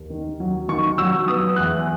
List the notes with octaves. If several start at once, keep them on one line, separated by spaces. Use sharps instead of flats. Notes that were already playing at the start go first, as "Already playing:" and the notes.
Already playing: D#2
D#3
F#3
D#3 C#6
F#3 E6
B3 D#6
E2 F#6